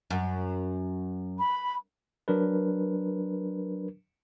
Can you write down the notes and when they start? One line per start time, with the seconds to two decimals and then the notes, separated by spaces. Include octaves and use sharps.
0.10 F#2
1.38 B5
2.28 F#3 D4 A#4 B4